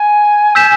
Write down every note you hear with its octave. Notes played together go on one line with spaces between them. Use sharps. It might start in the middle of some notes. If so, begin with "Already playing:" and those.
Already playing: G#5
E6 G6 B6 E7